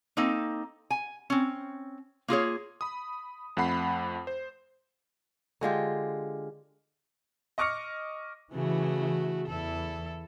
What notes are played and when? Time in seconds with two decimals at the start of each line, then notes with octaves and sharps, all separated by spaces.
0.17 A#3 C4 D#4 A4
0.90 G#5
1.30 C4 C#4
2.28 A#3 F4 G#4 C#5
2.81 B5 D#6
3.57 F2 A3 F#5 B5 C7
4.27 C5
5.61 D3 G#3 F4 G4
7.58 D#5 C#6 D6 F6 A#6 C#7
8.52 C#3 E3 A3 F#4
9.48 E2 E4 A4